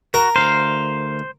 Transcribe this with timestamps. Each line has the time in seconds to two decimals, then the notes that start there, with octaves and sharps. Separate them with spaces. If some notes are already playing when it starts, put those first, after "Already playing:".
0.14 F#4 A#4
0.36 D2 D#3 C5 F5